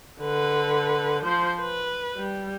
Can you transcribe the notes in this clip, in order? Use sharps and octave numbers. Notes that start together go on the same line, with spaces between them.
D3 B4
F3 C5
B4
G3